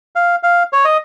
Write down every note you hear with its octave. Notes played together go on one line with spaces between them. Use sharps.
F5
F5
C#5
D#5